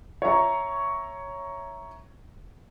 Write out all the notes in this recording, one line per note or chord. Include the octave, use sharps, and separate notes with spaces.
C#5 E5 A#5 C#6